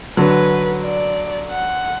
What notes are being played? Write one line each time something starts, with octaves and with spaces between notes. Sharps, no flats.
D3 F#3 B4
D5
F#5